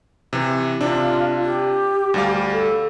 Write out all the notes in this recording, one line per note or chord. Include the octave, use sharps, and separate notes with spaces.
C3 E3
C3 D4 F4
G4
D2 G3 F5
A4